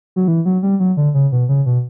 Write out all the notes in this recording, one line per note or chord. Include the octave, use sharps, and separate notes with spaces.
F#3
E3
F#3
G3
F#3
D3
C#3
B2
C#3
B2